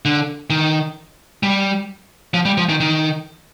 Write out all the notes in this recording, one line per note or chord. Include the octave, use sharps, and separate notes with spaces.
D3
D#3
G3
F3
G3
F3
D#3
D#3